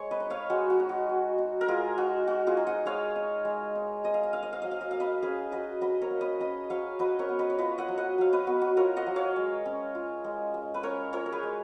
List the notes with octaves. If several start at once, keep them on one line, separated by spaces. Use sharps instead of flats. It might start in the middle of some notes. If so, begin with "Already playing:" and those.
Already playing: G#3 C#5
B4 D#5
D#4
C#5 F5
G#3 F#4
F#4
D#4
F#4
G#3
D#4
A#4
G#3 F4 G#4
D#4 F#4
G#3 F#4
F4 G#4
D#4
D#5 F#5
G#3 C#5 F5
D#4
G#3
D#4
G#3 D#5
F5
D#5
D#4 F5
D#5
F5
F#3 D#5
F5
D#5
A#3 F5
B4 D#5
C#4 G#4 B4
F#3 B4 D#5
F#3 B4 D#5
A#4 C#5
A#3
B4 D#5
C#4 B4 D#5
F#3 C#5 F5
F#3 B4 D#5
A#4 C#5
B3
B4 D#5
C#5
F4 B4 D#5
D#5 F#5
F#3
D#5 F#5
F#3 F5
B4 D#5
B3 F#4
F#4
F4 A#4 C#5
D#5 F#5
F#3
C#5 F5
G#3
C#4
F4
G#3
G#3
B4
C#4 A#4 C#5
F4 A#4 C#5
A#4
G#4 B4
G#3